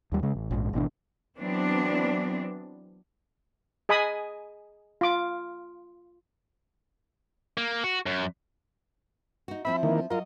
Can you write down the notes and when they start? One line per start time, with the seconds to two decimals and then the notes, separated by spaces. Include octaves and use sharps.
0.12 D#2 G3
0.23 C#3 G#3
0.35 A1
0.51 A#1 G#2
0.73 G#1 B2 E3 D4
1.38 E3 F#3 B3 C4 D4
3.89 G#4 D#5 G#5 B5 D#6
5.01 F4 D6
7.57 A#3
7.84 F#4
8.06 F#2
9.48 D#4 F#4
9.65 F3 C4 E4 E5 B5
9.83 D#3 E3 A#3
10.10 F#3 F4 A#4 D#5